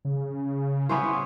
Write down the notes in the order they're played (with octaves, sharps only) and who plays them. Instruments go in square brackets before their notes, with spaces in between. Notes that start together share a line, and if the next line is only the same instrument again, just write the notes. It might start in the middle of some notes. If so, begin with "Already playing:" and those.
[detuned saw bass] C#3
[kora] B3 C#4 C5 [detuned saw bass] E4